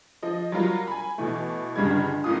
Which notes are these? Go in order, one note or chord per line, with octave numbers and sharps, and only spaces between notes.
F3 D#5
F#3 G3 F4 A#4
G#5 B5
B2 E3 A3
G1 G2 C#3 G3 G#3 G#6
F#1 A2 F4 D#6